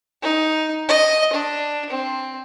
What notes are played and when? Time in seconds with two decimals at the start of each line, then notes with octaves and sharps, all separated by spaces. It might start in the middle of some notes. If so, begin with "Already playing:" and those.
0.22 D#4
0.89 D#5
1.33 D4
1.90 C4